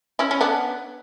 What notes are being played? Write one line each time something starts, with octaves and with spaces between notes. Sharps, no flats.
C#4 E4
C#4
B3 D4